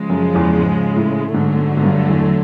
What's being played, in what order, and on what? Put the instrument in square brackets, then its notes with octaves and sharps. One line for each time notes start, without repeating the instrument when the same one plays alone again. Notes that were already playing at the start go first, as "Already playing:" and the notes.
Already playing: [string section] C#3 F3 G#3
[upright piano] F#2
E2
G#2
A2
[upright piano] G#2 [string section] D3 F#3 A3
[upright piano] G#2
G#2
G2
E2